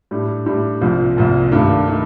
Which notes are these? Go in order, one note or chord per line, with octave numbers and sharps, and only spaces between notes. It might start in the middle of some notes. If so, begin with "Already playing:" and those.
A2 G3 D4
A2 G3 D4
C2 A#2 F3
C2 A#2 F3
G2 D#3 A3 D4
D#3 A3 D4